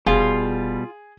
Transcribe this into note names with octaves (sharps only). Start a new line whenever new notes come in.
F1 B2 G3 F4 G#4